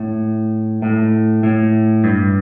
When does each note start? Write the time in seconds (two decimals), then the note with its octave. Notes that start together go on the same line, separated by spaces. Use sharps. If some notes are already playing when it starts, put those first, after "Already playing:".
Already playing: A2
0.82 A2
1.43 A2
2.04 G2